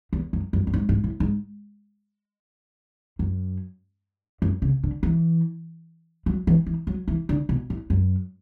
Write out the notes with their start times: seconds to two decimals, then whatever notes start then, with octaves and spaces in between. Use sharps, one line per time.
0.13 E2
0.33 F#2
0.53 F#2
0.67 F#2
0.74 G#2
0.89 G#2
1.04 A2
1.20 G#2
3.19 F#2
4.42 F#2
4.62 C#3
4.84 D3
5.03 E3
6.26 F#3
6.47 E3
6.67 E3
6.87 F#3
7.08 E3
7.29 D3
7.49 B2
7.70 A2
7.90 F#2